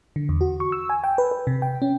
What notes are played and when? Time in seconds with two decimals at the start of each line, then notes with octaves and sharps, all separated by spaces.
0.16 D3
0.29 E2
0.41 F#4
0.60 C#6
0.72 E6
0.90 G#5
1.04 G5
1.18 B4
1.31 B4
1.47 C3
1.62 G5
1.82 C#4